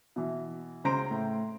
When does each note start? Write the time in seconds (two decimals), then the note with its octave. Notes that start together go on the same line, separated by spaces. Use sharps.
0.16 B2 E3
0.84 C#2 C#3 C5 A#5 C6 D7
1.11 A2